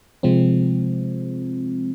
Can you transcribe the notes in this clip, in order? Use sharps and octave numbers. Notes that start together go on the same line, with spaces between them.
C3 F3 G#3 C4